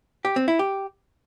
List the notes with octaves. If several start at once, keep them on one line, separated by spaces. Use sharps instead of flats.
G4
C4
E4
G4